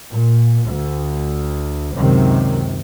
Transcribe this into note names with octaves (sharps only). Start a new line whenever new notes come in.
A#2
D2
C#2 F#2 C3 D#3